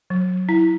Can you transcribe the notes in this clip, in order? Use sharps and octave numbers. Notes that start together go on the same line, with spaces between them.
F#3
E4